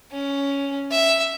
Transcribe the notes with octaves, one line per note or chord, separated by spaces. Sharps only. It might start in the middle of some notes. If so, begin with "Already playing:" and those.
C#4
E5